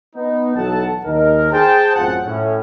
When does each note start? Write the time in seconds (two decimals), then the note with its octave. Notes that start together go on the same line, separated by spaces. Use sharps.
0.15 B3 D#4
0.55 B1 E3 F#3 A4 F#5 A5
1.05 D#2 D#4 A#4
1.52 G#4 C5 G5 A5
1.95 A1 F#2 C4 F4 G#4 F#5
2.26 A2 C#4